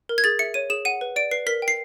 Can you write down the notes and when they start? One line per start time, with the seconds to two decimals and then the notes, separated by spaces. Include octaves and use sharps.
0.09 A#4
0.18 G#6
0.24 G#4 A6
0.39 E5 C#7
0.54 C#5 D#7
0.70 G#4 E7
0.85 F#5 D#7
1.01 B4
1.16 D5 D7
1.31 B4 C7
1.46 A#4 B6
1.62 G5
1.68 C7